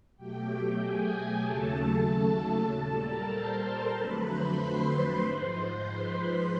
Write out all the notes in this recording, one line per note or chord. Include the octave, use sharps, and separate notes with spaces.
B2 F#3 A3 G4 G5
G#4 G#5
D#2 C#3 F#3 A3 A4 A5
A4 A5
A#2 G3 A4 A5
A#4 A#5
C5 C6
F2 D3 F#3 A3 B4 B5
C5 C6
B4 B5
G#2 F3 G#3 C5 C6
B4 B5